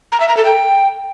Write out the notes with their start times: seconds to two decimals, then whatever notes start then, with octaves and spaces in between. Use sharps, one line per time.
0.12 A#5
0.20 E5
0.29 A#5
0.37 A4
0.45 G5